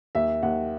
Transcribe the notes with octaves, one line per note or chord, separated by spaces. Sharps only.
D#2 E5
D#2 F#5